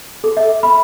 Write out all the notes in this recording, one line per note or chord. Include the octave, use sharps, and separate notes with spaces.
A4
E5
B5